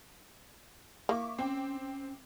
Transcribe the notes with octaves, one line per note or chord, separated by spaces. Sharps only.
A#3 E4 C#6 D6
C4 C#4 G5
C#4